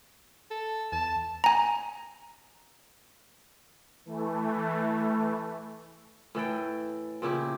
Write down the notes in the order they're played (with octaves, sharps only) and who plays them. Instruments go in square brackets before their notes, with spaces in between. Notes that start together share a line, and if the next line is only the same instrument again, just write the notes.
[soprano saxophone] A4
[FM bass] E2 [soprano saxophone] A5
[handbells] G#5 A#5
[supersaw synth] E3 A3
[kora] A2 E3 A4 G5
A#2 C#3 E4 G4